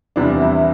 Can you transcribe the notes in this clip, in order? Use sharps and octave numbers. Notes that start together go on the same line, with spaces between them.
E2 C3 E3 G3 B3 D4
E4